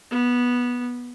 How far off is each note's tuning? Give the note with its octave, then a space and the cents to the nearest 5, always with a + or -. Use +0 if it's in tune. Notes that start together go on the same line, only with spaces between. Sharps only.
B3 -15